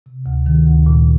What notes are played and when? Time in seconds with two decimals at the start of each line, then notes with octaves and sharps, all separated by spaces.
0.06 C3
0.26 D2
0.46 D#3
0.66 D2
0.86 A#2